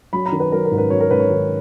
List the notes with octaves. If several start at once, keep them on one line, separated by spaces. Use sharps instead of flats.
F#3 B5
A#5
D#3
B4
F#3 A#4
A#4
G#2
B4
F#3 C#5
A#4
G#2 B4
C#5
D#3